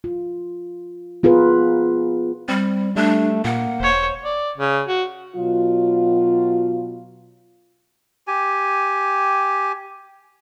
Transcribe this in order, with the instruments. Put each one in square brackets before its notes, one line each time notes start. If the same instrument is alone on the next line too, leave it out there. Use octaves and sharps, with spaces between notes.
[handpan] F4
B3 F4 G#4 A#4 B4
[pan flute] G3 [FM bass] C4
[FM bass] G3 [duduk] A3 [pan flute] D4
[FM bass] A#2 [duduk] A#3 [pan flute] F#5
[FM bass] E1 [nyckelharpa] C5 C#5
[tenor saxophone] D5
C#3
F#4
[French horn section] B2 F#3 F4
[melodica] G4 G#5